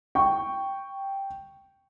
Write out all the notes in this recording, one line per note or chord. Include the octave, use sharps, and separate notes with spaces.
G5 C#6